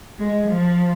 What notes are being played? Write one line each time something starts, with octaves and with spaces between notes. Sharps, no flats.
G#3
F3